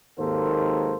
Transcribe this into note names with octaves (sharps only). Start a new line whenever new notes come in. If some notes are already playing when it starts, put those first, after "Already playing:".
G#1 D#2 G#2 A#3 A4 C5